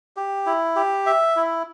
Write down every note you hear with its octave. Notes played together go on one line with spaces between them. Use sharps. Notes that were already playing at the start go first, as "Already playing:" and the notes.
G4
E4
G4
E5
E4